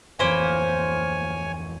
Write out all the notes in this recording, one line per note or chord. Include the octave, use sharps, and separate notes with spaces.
D1 F2 E3 A#3 C5 C#5 G#5 B5